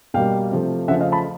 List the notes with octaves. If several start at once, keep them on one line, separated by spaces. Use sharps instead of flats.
B2 G3 A#3 F5 G5
C3 F3 A3
C#3 F3 A3 E5 F#5
D#5 F5
A5 B5